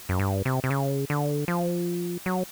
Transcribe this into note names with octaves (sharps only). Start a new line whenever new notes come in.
F#2
G2
C3
C3
C#3
D3
F3
F#3